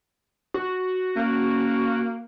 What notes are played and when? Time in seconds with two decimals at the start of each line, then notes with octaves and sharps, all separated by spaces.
0.54 F#4
1.17 A#3 C#4